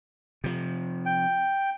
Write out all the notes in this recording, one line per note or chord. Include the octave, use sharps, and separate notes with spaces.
C3 F3
G5